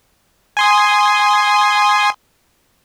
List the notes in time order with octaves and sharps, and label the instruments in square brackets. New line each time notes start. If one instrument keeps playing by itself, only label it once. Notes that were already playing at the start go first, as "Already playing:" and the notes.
[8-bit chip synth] G#5 C6 D#6